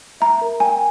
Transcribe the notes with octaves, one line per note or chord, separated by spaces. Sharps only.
E5 A#5
A#4
G5 G#5